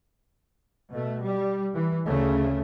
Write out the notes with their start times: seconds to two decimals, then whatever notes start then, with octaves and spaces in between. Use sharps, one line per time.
0.90 B2 A3
1.21 G3
1.75 E3
2.05 D2 C#3 A3